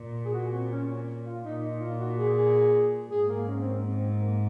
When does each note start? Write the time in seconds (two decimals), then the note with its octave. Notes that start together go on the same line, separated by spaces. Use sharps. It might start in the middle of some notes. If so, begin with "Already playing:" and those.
Already playing: A#2
0.25 G#4
0.33 F#4
0.52 C4
0.70 C#4
1.25 F4
1.43 A#2 D#4
1.62 D#4
1.80 F4
1.99 F#4
2.17 G#4
2.36 G#4
3.10 G#2 G#4
3.28 A#3
3.47 C#4
3.59 C4
3.73 A#3
3.86 C4
4.19 A#3